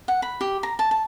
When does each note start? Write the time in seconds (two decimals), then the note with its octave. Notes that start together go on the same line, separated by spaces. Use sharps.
0.08 F#5
0.22 B5
0.41 G4
0.63 A#5
0.79 A5
0.91 A5